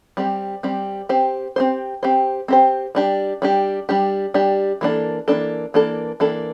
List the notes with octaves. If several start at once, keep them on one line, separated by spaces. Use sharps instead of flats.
G3 C4 G4
G3 C4 G4
C4 G4 C5
C4 G4 C5
C4 G4 C5
C4 G4 C5
G3 D4 G4
G3 D4 G4
G3 D4 G4
G3 D4 G4
E3 A#3 D4 A4
E3 A#3 D4 A4
E3 A#3 D4 A4
E3 A#3 D4 A4